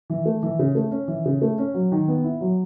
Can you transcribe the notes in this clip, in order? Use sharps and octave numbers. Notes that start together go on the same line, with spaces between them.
E3
A3
E3
C#3
A3
C#4
E3
C#3
A3
C#4
F#3
D#3
B3
E4
F#3